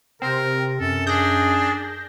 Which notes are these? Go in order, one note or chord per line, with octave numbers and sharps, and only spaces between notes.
C3 C4 A#4
F#2 A4
D4 G#4 G6 A#6